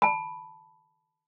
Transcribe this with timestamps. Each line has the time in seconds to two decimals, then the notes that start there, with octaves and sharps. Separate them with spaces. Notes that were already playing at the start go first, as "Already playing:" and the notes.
0.02 A5 B5